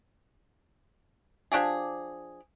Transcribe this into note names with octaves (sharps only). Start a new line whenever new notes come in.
F3 D4 G4 G#4